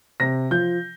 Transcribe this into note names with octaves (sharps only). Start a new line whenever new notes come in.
C3 A#6
F3 G6